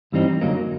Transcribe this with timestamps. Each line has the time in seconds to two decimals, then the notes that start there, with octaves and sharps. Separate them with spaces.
0.12 G2 E3 G3 C4 D#4
0.41 F#2 D3 F#3 A#3 D#4